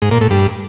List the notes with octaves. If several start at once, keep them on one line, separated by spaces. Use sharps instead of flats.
G#2
A#2
A2
G2